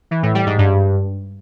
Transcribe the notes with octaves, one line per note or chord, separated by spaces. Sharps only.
E3
A2
G3
G#2
G2